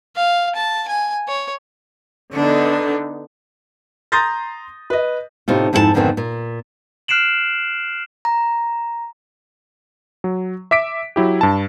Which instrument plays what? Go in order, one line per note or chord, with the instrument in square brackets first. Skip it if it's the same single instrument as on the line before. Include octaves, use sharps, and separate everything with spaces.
[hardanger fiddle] F5
A5
G#5
C#5
[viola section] D3 B3 D#4 [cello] D4
[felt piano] A#5 C6 D#6 G6 A6 A#6
B4 D#5
[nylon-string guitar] A2 C3 D#4 F4
F2 G#2 E4 F4 A4 A5
F2 G#2 B2 D3 D#3 C4
A#2
[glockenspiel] F6 F#6 C7 D7 E7 F#7
[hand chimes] A#5
[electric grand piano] F#3
E5 D6 B6 D7
F#3 E4 G4
G2 A5